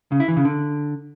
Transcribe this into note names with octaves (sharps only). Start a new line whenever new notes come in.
C#3
E4
E3
C#3
D3